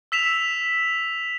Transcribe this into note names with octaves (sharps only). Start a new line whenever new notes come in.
E6 B6 E7 F7